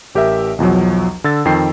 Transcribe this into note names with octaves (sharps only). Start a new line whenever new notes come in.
A1 G4 A#4 E5
B1 E2 F3 F#3
D3 E6 A6
F2 D#3 G5 C7